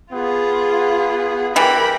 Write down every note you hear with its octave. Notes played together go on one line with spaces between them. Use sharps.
B3 F4 G#4
E3 G3 A#4 G5 B5